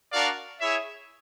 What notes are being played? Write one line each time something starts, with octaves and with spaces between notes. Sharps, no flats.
D4 F#4 A#4 D5 F5
E4 G#4 C#5 E5